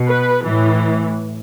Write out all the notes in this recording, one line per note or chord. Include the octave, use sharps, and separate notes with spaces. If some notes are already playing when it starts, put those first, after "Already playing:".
Already playing: B2
B4
A2 E3